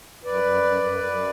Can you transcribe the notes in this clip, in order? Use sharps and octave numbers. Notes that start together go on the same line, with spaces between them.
F#2 B4 D5
F#2
F#2
F#2
F#2